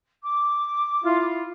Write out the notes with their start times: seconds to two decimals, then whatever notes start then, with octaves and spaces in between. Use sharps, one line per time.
0.22 D6
1.04 E4 F4